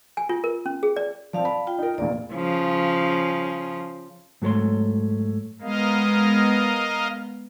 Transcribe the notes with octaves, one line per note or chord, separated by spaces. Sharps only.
G#5
F4
A#4
C#4
G#4
D5
F3 C4 D5 F5 A5
B5
F4 G5
D#4 A#4
F1 E2 A#2 D5
C#3 F3
G#2 F#3 A3 A4 C#5 C6
G#3 B3 A#4 D#5 F5